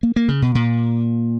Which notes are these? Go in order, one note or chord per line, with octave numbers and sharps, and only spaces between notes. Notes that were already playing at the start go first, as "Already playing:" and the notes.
A#3
A#3
C#3
B2
A#2